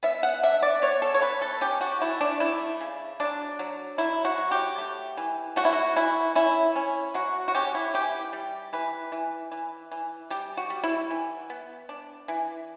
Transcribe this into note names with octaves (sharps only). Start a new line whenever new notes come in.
B3 E5
F#5
D4 E5
D5
B3 C#5
A4
C#5
B3 B4
A4
C#4 G4
F#4
A3 E4
D4
A3 E4
C#3
F#3 D4
F#3
F#3 E4
F#4
F#3
G4
A3
E3
A3 F#4
E4
F#4
E3 E4
C#4 E4
C#4
F#3 F#4
F#4
C#4 G4
E4
E3 G4
G3
E3 B4
E3
E3
E3
G3 G4
F#4
G3
E4
E3
B3
D4
E3